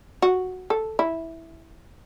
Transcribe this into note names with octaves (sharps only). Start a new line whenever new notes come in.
F#4
A4
E4